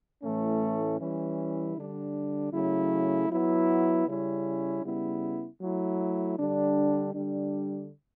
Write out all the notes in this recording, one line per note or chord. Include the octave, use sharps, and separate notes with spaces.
A2 E3 A3 C#4
E3 G3 C#4 E4
D3 G3 D4
C#3 F#3 A3 E4
F#3 B3 E4
C#3 G3 C#4 E4
C#3 G3 B3 E4
F#3 A3 E4
D3 G3 D4
D3 G3 D4